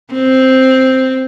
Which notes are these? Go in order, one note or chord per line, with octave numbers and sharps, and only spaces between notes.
C4